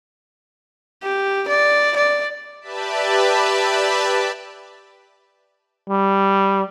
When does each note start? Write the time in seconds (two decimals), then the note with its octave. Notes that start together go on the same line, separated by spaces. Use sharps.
1.03 G4
1.48 D5
1.96 D5
2.61 G4 B4 D5 E5 A5 B5
5.90 G3